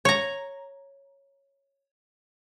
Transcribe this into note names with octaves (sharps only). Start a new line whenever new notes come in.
C#5 A#5